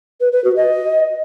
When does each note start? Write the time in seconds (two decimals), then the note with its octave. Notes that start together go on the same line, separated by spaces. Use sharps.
0.21 B4
0.33 B4
0.44 F#4
0.56 D#5